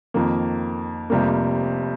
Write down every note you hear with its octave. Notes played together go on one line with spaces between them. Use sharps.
F2 D#3 A#3
F1 F2 C3 G3 A#3